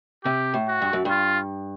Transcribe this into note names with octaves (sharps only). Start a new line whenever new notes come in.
C3 G4
A2
F#4
G2
F#2
G2 F4